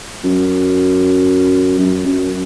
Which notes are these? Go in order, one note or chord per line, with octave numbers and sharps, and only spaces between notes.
F#2
F#2
F#2